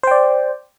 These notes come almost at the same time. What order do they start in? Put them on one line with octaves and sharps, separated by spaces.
C5 G5 D5